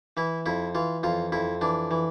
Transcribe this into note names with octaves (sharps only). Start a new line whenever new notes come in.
E3 E4
F2 E4
E3 F4
F2 F4
F2 E4
E3 D4
E3